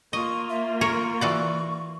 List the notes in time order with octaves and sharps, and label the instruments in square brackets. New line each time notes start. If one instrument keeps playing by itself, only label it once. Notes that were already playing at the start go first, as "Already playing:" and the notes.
[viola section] A#3 F4 [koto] D#5 [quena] C#6
[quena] E5
[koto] A#4 C#5 [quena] C#6
[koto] E3 F#4 D5